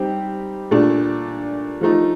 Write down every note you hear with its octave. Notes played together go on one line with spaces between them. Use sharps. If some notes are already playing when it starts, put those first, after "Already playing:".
Already playing: G3 C4 D#4 G4
A#2 A3 D4
F3 A3 D#4